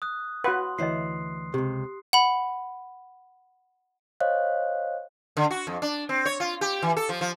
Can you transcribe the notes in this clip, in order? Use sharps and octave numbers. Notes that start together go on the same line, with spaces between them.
D#6 F#6
F#4 B4 F5 F#5 C6
D2 E3 E4 C#5 D#5 C7
C#2 C3 G4
F#5 B5
C5 C#5 D#5 F5 F#6
D3
F#4
F2
D4
C4
C#5
F4
G4
E3
A4
F3
F3